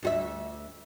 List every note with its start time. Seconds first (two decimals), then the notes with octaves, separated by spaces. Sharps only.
0.03 D2 F#4 E5